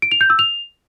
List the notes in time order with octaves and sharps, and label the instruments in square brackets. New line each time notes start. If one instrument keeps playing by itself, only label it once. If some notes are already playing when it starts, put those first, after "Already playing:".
[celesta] D7
F7
G6
E6
F7